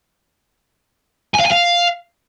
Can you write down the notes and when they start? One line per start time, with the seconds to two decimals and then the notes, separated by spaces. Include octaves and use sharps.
1.35 G#5
1.41 F5
1.46 G#5
1.52 F5